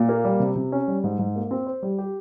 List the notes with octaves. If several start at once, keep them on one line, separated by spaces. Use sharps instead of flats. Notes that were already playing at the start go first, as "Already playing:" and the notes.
Already playing: A#2
A#3
G3
C3
C3
C#4
G3
G#2
G#2
A#3
C4
C5
G3
G4